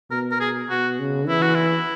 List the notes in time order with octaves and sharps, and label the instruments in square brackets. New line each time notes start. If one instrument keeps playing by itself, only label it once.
[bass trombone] B2 [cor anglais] A#4
[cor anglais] A#4
G#4
[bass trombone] B2 [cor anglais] F#4
[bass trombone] C#3
[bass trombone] E3 [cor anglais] E4
[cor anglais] F#4
E4